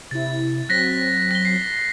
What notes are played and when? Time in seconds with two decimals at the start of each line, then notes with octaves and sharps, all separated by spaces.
0.11 C3 E4 A6
0.69 F#3 C4 F#6 A#6 B6
1.31 A#6 G7
1.45 C7